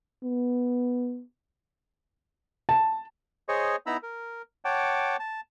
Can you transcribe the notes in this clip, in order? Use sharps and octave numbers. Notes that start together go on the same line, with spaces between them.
B3
A5
G#4 C5 C#5 D#5 C#6
B3 D#4 E4 A#5 B5 E6
A#4
C#5 F#5 G5 A5 D6
A5